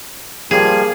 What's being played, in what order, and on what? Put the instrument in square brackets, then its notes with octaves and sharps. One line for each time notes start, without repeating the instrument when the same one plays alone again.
[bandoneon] F3 G3 A#3 [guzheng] G#4